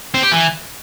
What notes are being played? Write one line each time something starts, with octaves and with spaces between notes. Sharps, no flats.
C4
G4
E3